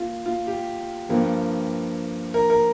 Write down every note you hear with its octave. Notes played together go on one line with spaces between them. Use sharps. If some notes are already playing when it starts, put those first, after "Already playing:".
Already playing: A#3 F4
F4
G4
G2 F3 A#3
A#4
A#4